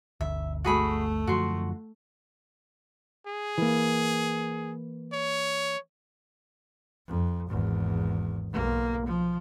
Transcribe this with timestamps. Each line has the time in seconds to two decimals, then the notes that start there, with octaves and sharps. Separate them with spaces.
0.21 G1 D2 E5
0.65 A3 F#4 G#4 B5
1.27 F#2 D3 F3 F#4 C6
3.27 G#4
3.58 E3 A#3
5.13 C#5
7.07 F2
7.49 G#1 E2
8.51 B1 A#3
9.07 F3